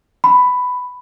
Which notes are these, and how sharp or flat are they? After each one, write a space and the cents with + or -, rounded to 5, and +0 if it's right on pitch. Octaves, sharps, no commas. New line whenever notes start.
B5 +10